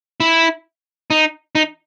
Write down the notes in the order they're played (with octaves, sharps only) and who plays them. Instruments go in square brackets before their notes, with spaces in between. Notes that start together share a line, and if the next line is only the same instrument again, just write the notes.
[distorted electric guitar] E4
D#4
D#4